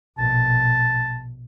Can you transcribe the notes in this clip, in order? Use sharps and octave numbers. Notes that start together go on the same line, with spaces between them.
A#1 B2 A5